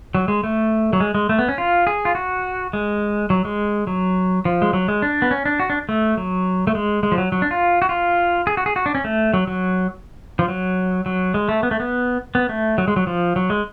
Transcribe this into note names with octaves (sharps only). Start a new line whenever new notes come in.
F#3
G#3
A3
F#3
G#3
G#3
A3
B3
C#4
F4
G#4
F4
F#4
G#3
F#3
G#3
F#3
F3
G#3
F#3
G#3
D4
B3
C#4
D4
F#4
D4
A3
F#3
A3
G#3
G#3
F3
F#3
F#3
D4
F4
F#4
F4
G#4
F#4
G#4
F#4
D4
C#4
A3
F#3
F#3
F3
F#3
F#3
G#3
A3
B3
A3
B3
B3
A3
F#3
G#3
F#3
F3
F#3
G#3